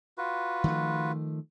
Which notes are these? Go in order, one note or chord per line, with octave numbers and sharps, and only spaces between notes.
F4 F#4 B4
D#3 F3 A3